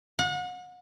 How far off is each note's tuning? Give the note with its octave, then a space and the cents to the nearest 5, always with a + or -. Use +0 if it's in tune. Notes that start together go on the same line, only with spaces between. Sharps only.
F#5 -35